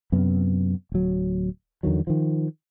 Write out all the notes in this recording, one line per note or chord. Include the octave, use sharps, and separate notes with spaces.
F#2 C3 B3
D1 F#3
E2 D3 D#3 F#3
D#3 F3